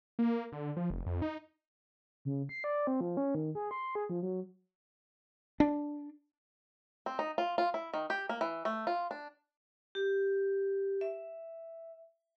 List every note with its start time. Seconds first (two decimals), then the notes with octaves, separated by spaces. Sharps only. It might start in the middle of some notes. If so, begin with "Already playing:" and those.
0.19 A#3
0.52 D3
0.77 F3
0.90 F1
1.06 F2
1.22 D#4
2.25 C#3
2.49 C7
2.64 D5
2.87 C4
3.01 F3
3.17 C#4
3.35 D#3
3.55 G#4
3.71 C6
3.95 G#4
4.10 F3
4.23 F#3
5.60 D4
7.06 C4
7.19 D#4
7.38 F4
7.58 F4
7.74 E4
7.94 D#3
8.10 G4
8.29 A#3
8.41 E3
8.65 A3
8.87 F4
9.11 D4
9.95 G4
11.01 E5